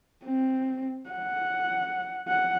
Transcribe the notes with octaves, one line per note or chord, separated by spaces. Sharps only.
C4
F#5
F#5